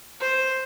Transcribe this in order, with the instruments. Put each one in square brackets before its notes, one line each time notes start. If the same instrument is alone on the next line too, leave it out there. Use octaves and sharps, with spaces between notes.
[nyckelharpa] C5